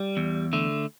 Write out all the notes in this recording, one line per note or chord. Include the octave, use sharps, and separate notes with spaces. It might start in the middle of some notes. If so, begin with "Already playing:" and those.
Already playing: G3
E2
D3 A3